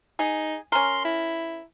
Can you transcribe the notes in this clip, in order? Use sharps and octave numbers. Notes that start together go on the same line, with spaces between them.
D#4 G#4
C#4 A#4 C6
E4